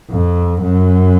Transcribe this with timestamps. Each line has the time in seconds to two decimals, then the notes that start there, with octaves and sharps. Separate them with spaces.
0.11 F2
0.62 F#2